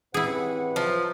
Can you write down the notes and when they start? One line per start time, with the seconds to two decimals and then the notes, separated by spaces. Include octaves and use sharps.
0.14 A2 E3 C4 E4 G4 G#4 B4 F#5
0.76 F3 F#3